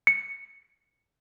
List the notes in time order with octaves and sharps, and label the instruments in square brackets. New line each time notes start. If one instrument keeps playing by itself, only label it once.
[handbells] C#7